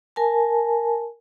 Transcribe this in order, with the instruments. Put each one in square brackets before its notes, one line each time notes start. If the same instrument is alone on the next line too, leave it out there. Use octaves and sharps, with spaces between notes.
[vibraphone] A#4 G#5 A5